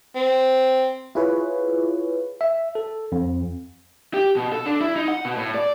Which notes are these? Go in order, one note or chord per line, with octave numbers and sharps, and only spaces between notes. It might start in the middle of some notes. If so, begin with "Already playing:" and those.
C4
E4 F4 G#4 B4 C#5
E5
A4
F2
G4
B2
A4
D4
E4
D#4
F#5
B2
A2
D5